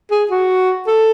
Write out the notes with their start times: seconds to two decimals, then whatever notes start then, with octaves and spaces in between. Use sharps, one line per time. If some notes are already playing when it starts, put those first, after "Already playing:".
0.11 G#4
0.31 F#4
0.87 A4